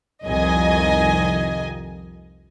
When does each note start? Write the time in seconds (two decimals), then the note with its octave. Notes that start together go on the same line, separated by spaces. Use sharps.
0.25 C2 F2 D#3 D#5 G#5